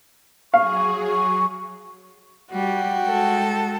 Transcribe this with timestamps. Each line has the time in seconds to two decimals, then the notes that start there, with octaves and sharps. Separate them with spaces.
0.54 F#3 G#4 F5 C#6
1.08 C#6
2.51 G3 F#4 G5
3.05 G#3 A4